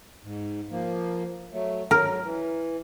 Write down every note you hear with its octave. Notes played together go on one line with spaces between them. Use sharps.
G#2
F3 A#3
F#3 A3
F#3 A#4
E3